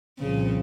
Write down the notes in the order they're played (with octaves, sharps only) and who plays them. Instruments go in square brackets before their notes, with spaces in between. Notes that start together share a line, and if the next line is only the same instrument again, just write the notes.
[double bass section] C2 A#2 F3 C4 [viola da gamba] C#3